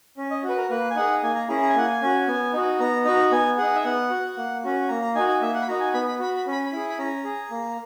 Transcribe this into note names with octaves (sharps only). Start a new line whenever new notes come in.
C#4
D#5
F#4
B4
A#4
A#3 B4
G#5
D#4 G#4 F#5
A#3 G#5
A#5
C#4 E4 G#4 A#5
A#5
G#5
A#3 F#5
G#5
C#4 F#4
B3
D#4 F#4
B3 A#5
D#4 F#4 A#5
B3 G#5
D#4 G#4 F#5
E5
B3 F#5
F#4
A#3
C#4 F#4
A#3 A#5
A#5
D#4 F#4 G#5
G#5
A#3 E5
F#5
B5
D#4 F#4 A#5
G#5
B3 B5
B5
F#4 B5
B5
C#4
B5
B5
E4 G#4
B5
C#4 A#5
G#4
A#3